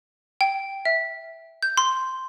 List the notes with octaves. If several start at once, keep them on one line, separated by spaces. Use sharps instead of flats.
G5
E5
G6
C6